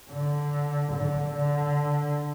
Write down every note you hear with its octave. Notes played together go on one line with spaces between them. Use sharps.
D3
D3
D3